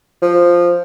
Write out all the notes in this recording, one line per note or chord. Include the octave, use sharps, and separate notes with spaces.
F3